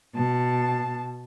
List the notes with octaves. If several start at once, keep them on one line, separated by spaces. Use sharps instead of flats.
B2 A5